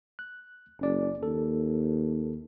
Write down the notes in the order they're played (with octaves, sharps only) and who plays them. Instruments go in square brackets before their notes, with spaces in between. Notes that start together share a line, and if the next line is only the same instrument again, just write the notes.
[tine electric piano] F#6
[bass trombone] F#1 [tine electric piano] C#4 D5
[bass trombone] D#2 [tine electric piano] A4